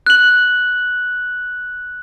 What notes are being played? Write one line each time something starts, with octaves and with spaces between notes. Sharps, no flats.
F#6 F#7